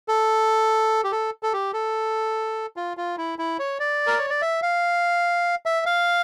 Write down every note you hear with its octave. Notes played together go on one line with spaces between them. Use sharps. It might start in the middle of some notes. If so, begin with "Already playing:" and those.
A4
G4
A4
A4
G4
A4
F4
F4
E4
E4
C#5
D5
A#4
C#5
D5
E5
F5
E5
F5